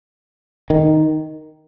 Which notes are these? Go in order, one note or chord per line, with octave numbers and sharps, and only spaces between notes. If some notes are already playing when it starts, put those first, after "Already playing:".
D#3